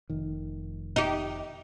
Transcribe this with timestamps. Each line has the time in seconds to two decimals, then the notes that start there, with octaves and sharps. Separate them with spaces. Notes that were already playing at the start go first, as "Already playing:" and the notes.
0.10 F1 D#3
0.96 D#4 G4